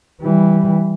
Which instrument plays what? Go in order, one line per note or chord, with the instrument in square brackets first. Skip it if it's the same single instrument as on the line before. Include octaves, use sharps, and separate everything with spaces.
[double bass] E3 G3